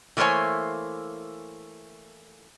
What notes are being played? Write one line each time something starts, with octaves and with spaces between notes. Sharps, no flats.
E3 A3 A#3 C5 C#5 G#5